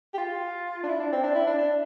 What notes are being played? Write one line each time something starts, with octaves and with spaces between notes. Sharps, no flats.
G4
F4
D4
E4
D4
C4
D4
E4
D4
D4